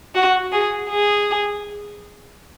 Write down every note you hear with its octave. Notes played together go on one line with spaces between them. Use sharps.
F#4
G#4
G#4